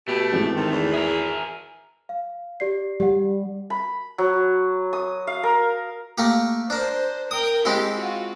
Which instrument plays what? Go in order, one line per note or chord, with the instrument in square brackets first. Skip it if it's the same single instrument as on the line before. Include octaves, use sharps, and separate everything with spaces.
[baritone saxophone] B2 [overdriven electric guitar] A3 [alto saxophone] G4
[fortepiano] G#1 E3 G#3
[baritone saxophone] C3 [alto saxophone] D#3
[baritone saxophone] E2
[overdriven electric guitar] G#4 A#4 [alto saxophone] E5
[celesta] F5
G4 D5 C7
[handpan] G3 [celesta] G4 F#5
[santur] B5
F#3
D#6
F5
A#4
[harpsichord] A3 A#3 G4
[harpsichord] D4 A#4 [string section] C5
[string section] A#4 G5 [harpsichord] D#6
[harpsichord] G#3 C4 E4 [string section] G4
[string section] F4 F#4